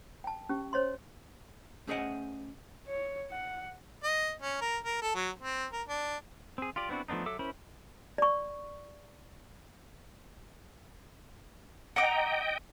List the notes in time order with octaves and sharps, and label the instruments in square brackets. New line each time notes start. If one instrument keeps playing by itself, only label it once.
[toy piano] G5 A5
C#4 G4
C5 C#5 D#5 C6
[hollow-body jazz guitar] A3 C#4 G#4 C5 D#5 F#5
[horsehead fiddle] C#5
F#5
[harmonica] D#5
C#4
A#4
A#4
A4
F#3
C4
A#4
D4
[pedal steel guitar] C4 G#4
F4 G4 D5
B3 C4 D4 E4 F#4
F3 A3 B3 D4 D#4
F#3 A4 E5 D6
C#4 E4 A#4 C5 B5
[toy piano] D5 C#6
[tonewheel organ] D#5 G5 [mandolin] F#5 A#5 D6